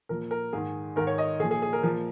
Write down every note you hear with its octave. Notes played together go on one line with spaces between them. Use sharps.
A#2 F3 A#4
A#4
G#2 D#3 G#4
G#2 D#3 A#4
C#5
D#5
A#2 F3 G#4
G#4
G#4
A#4
A#2 F3 A#4